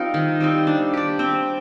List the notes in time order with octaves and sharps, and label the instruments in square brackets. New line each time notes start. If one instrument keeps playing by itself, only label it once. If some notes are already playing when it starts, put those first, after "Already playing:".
Already playing: [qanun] G3 C4 D#4 A#4 [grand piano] F4
[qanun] D#3
G3 C4 D#4
D4
G4 D5
C4